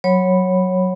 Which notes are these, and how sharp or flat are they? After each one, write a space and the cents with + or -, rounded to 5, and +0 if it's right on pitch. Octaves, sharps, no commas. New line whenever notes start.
F#3 +0 C#5 -15 B5 +0